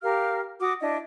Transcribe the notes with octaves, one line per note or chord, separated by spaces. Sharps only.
G4 A#4 F5 F6
F#4 D6 D#6
D4 E4 D#5